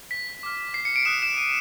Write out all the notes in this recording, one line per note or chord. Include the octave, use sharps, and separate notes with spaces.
B6
D6 F6
C7
C#7
D7
D#6 F#6 E7
E7
D#7